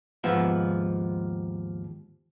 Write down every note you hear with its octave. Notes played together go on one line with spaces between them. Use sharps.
D#2 G#2 F3 B3 E5